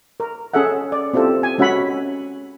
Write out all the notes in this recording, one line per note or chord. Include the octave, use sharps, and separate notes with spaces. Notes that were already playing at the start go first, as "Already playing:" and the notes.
A#4
C#4 G#4 A4 E5 F#5
D5
C4 E4 F4 G4 A4
G#5
G#3 C#4 F#4 E5 F#5 B5